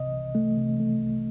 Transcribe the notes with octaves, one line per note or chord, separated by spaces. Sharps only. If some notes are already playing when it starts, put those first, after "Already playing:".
Already playing: C2 C3 D#5
C2
A3
C3
A3
C2